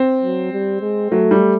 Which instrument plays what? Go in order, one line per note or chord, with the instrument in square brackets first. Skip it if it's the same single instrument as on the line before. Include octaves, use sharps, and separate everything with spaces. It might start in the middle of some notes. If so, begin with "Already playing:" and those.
Already playing: [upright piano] C4
[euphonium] F#3
G3
G#3
[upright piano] F#3 [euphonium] A3
[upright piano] G3